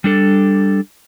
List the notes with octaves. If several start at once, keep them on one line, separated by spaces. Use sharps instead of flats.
G3 D4 A4